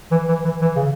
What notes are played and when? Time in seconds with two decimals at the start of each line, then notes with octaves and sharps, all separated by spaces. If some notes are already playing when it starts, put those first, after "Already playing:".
0.11 E3
0.28 E3
0.45 E3
0.61 E3
0.76 C#3